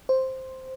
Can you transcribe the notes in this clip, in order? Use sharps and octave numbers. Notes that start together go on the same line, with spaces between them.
C5